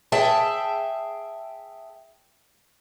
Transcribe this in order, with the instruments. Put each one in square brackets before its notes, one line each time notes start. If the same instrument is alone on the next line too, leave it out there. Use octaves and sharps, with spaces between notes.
[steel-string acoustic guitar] G#4 E5 G5 A5